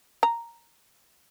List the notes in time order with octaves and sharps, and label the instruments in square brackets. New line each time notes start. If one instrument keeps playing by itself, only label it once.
[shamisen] A#5